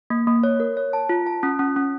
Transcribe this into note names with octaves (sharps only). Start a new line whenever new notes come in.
A#3
A#3
C#5
A#4
C#5
A5
F4
A5
C#4
C#4
C#4